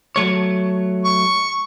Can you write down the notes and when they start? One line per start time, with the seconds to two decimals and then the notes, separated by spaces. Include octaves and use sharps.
0.16 F#3 A3 C#5
1.04 C#6